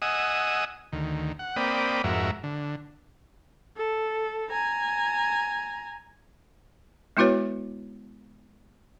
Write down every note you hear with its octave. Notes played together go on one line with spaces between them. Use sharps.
D#5 F#5 G#5 D#6 E6
D2 D#3
F#5
A#3 C4 D5 G5 B5 D#6
F2 G#2 F#4 A#4 E5
D3
A4
G#5 A#5
G#3 B3 E4 F#4 B4 C#5